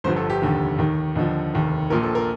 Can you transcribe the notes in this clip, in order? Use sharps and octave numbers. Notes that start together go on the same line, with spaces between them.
G1 G2 D3 F3 C5
A4
G4
F1 D#2 D3
D#2 D#3
D#2 D3 F3 D#4
F1 D#2 D#3
A#1 A#2 F3 A#4
A4
A#4